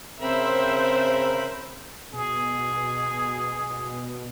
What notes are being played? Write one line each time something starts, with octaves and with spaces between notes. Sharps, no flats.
C#3 C4 A#4 C5 E5 B5
B2 G#4